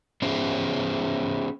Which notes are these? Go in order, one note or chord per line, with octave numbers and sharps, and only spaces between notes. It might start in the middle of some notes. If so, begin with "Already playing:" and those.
B3 C#4 F4 G#4 C5